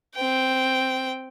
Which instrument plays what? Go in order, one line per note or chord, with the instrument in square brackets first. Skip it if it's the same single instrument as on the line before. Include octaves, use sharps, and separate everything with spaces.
[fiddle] C4 G5